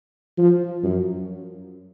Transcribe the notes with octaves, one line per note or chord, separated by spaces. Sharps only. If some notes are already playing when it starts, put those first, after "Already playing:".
F3
F#2